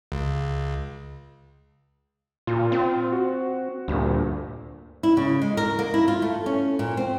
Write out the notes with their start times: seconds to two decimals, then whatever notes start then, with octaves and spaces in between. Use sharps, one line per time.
0.12 C#2
2.47 A#2 F4
2.72 C4
3.12 F#4
3.88 D2 G2 A#2
5.03 E4
5.17 C#3
5.41 G#3
5.57 A#4
5.79 A#3
5.94 E4
6.08 F4
6.22 A3
6.46 C#4
6.79 A#2
6.97 C4